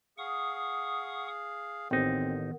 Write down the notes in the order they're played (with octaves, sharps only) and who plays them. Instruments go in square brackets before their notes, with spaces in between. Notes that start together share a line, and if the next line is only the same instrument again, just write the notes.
[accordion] G#4 F5 [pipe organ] F#5 C#6 D#6
[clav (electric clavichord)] A1 D#4 [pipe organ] D#3 B3 [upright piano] C4